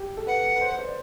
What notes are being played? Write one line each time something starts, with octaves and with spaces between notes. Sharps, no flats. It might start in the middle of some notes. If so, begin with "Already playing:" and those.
Already playing: G4
A4
B4 F#5
B4
C5
B4
C5
D5